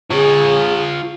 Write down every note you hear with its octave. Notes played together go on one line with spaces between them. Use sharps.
F4 G#4 C#5